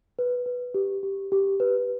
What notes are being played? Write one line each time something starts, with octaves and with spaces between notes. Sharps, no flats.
B4
B4
G4
G4
G4
B4